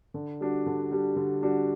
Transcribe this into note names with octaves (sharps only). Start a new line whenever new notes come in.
D3
G3 D4 F#4
D3
G3 D4 F#4
D3
G3 D4 F#4